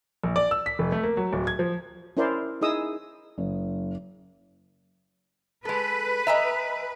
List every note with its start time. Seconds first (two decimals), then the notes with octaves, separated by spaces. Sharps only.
0.24 A#1
0.36 D5
0.51 E6
0.66 B6
0.79 F1
0.92 A3
1.03 A#3
1.17 F#3
1.33 D1
1.47 G#6
1.59 F3
2.17 C#4 E4 A#4 C5 D5 C6
2.61 D#4 E4 G#4 D#5 D#6 E6
3.38 F#1
5.65 G#3 A4 B4
6.27 D#5 E5 G#5 A#5